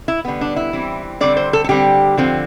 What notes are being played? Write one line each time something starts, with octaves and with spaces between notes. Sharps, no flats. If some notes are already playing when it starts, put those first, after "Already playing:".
E4
D3 G3 B3
D4
E4
E3 G3 C4
D3 G3 C4 D5
C5
A4
A4
D3 G3 C4 G4
D3 F3 C4